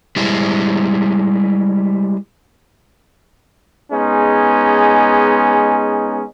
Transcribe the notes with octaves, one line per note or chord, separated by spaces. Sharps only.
G3 G#3 E4
G#3 B3 C#4 D#4 G#4